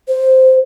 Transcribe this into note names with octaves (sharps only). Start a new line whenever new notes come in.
C5